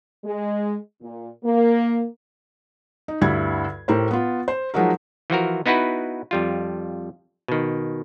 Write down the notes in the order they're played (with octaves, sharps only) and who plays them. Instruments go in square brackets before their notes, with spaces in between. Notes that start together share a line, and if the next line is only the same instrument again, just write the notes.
[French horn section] G#3
A#2
A#3
[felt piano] D#4
D2 G2 E4 B5 G#6
A2 G4 A#4 C5
B3 F4
C5
F3 F#3 G#3 D#4 F#4 A#4
[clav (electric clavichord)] E3 F3 F#4 A#4
B3 D#4 E4 F#4 B4
F2 G3 F4
B2 D#3